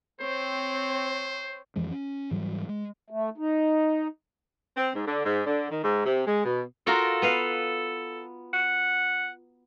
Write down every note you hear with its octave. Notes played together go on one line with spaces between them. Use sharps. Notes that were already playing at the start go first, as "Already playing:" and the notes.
C4 C5 C#5
F2 E3 F3 G#3
C#4
G#2 E3 F#3 G3
G#3
A3
D#4
C4
G#2
D3
G#2
D3
D#3
G#2
C3
G#3
B2
F4 F#4 A4 A#4
B3 B4 F5
F#5